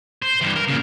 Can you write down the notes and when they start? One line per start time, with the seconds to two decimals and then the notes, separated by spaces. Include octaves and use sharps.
0.22 C5
0.41 G2 E3
0.56 A#4
0.68 A#2 C#3